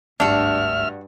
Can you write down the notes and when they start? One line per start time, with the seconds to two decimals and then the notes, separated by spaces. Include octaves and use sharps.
0.20 G#1 D2 G2 D4 F#4 E5 F6